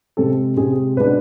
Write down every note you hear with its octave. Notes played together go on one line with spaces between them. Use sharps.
C3 G#3 C4 A4
C3 G#3 C4 G#4
B2 G#3 B3 D4 B4